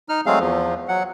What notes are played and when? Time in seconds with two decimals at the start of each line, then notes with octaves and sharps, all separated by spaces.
0.09 D#4 F6
0.26 F#3 G#3 A3 C4 G#4 F5
0.40 E2 F3
0.88 F#3 F#5